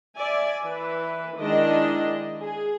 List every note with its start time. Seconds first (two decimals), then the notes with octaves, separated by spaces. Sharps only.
0.18 D5 E5 G#5
0.67 E3 B4
1.39 D#3 G#3 D4 E4 D#5
2.41 G#4